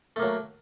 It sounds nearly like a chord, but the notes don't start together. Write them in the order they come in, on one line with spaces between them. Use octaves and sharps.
A3 A#3 F#3